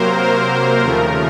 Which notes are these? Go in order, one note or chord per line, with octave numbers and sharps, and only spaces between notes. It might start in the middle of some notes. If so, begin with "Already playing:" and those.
Already playing: C3 F#3 A#3 A#4 C5
A#4
D#2 C#3 F3 A3 A#4